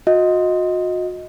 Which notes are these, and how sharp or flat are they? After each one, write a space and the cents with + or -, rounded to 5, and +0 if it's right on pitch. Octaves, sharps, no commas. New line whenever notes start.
F#4 -35 D#5 +10